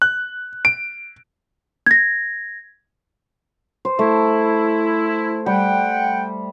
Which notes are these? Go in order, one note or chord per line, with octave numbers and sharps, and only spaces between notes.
F#6
D7
G#6 A#6
C5
A3 E4
G3 F#5 G5